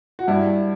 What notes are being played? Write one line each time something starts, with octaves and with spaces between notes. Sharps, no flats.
F#4
G2 E4